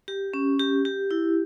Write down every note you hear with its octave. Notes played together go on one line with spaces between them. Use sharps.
G4
C#4
G4
G4
E4